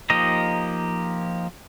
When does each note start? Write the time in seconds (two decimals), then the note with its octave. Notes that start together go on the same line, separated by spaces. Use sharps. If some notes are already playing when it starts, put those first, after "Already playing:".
0.10 F3 A#3 D#4 G4 D#5